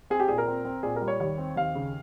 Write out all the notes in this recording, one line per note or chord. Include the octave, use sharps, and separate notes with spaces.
C4 G#4
G4
A#2 G#4
A#4
C4
C4
A#2 G#4
A#4
G3
C#5
D#2 C#5
C4
D#2 F5
C#3